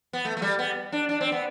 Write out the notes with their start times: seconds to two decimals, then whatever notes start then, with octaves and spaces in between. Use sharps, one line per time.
0.13 B3
0.25 A3
0.37 A3
0.42 G3
0.59 B3
0.92 D4
1.09 D4
1.21 C4
1.32 B3